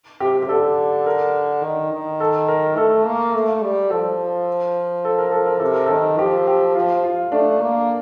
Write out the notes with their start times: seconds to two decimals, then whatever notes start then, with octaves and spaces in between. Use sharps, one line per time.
0.20 C3 G4
0.42 G4
0.49 D3 A4
1.06 A#4
1.63 D#3
1.92 D#3
2.20 A4
2.48 A#4
2.76 A3 A4
3.05 A#3
3.34 A3
3.62 G3
3.90 F3 A4
5.05 A4
5.18 A#4
5.31 A4
5.46 A#4
5.59 C3 A4
5.73 A#4
5.86 D#3 A4
6.18 F3 G4
6.47 G4
6.75 F3 F4
7.04 F4
7.32 A3 D4
7.61 A#3